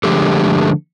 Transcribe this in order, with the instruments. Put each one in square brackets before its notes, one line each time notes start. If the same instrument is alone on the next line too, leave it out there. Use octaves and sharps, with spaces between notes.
[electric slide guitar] D3 F3 G#3 A3 G4 A4